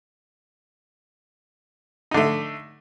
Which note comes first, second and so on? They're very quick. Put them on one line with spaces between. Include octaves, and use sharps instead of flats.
D#4 D3 A3